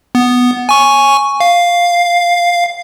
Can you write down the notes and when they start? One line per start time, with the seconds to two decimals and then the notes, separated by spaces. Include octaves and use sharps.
0.15 B3
0.69 G#5 C#6
1.40 F5